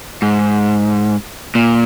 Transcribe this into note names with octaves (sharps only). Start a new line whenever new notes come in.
G#2
A#2